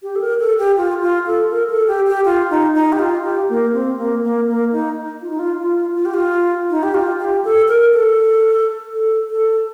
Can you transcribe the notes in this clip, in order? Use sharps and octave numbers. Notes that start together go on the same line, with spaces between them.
G4
A4
A#4
A4
G4
F4
F4
A4
A#4
A4
G4
G4
F4
D#4
D#4
G4
F4
G4
A#3
C4
A#3
A#3
A#3
D#4
F4
D#4
F4
F4
F4
G4
F4
D#4
G4
F4
G4
A4
A#4
A4
A4
A4